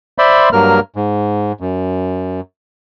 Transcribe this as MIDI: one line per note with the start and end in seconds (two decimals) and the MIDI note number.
0.18 0.49 72
0.18 0.49 74
0.18 0.49 76
0.18 0.49 83
0.18 0.49 84
0.53 0.80 43
0.53 0.80 54
0.53 0.80 58
0.53 0.80 70
0.53 0.80 89
0.96 1.52 44
1.60 2.40 42